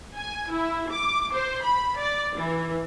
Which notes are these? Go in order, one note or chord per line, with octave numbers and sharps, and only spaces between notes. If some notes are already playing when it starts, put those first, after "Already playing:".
G#5
E4
D6
C5
B5
D5
E3